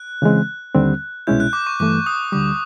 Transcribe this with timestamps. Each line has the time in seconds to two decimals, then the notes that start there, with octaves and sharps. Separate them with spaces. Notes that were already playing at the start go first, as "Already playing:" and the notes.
Already playing: F#6
0.22 C#3 E3 G#3 C4
0.75 D#2 D3 G3 C4
1.27 C2 B2 G#3 C#4 E4 G6
1.40 F#6
1.53 D6
1.67 C#6
1.80 G2 E3 A3 D6
2.06 D#6
2.32 D2 D3 G3 D6